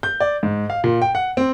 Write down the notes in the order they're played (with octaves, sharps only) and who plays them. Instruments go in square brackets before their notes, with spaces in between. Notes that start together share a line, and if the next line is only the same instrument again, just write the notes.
[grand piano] G6
D5
G#2
F5
A#2
G5
F#5
C4